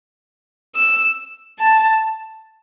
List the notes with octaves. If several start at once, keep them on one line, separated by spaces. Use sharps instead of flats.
E6
A5